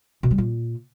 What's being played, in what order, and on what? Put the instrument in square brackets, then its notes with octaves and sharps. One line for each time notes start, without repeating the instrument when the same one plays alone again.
[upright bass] B2
G3
A#2